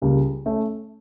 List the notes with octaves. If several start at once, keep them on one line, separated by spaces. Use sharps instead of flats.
C#2 C#3 G3 A#3
A3 C#4